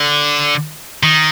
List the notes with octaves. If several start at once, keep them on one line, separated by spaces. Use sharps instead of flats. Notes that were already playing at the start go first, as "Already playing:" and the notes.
Already playing: D3
D#3